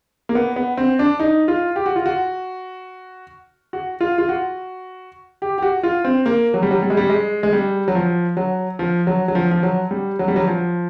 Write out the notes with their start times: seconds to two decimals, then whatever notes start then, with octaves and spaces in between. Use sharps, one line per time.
0.29 A#3
0.35 B3
0.56 B3
0.77 C4
0.99 D4
1.20 D#4
1.48 F4
1.76 G4
1.86 F#4
1.96 F4
2.06 F#4
3.73 F#4
4.01 F4
4.18 F4
4.29 F#4
5.42 G4
5.58 G4
5.62 F#4
5.83 F4
6.04 C4
6.26 A#3
6.54 F#3
6.63 G3
6.71 F#3
6.82 G3
6.90 G#3
6.97 G3
7.10 G#3
7.43 G#3
7.53 G3
7.88 F#3
7.95 F3
8.37 F#3
8.79 F3
9.07 F#3
9.28 F#3
9.35 F3
9.51 F3
9.63 F#3
9.91 G3
10.19 F#3
10.28 G3
10.36 F#3
10.47 F3